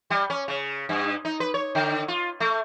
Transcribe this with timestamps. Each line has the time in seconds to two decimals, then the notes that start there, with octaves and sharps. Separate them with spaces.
0.10 G3
0.30 C#4
0.48 C#3
0.89 G2
1.25 D#4
1.40 B4
1.54 C#5
1.75 D3
2.08 F4
2.40 A3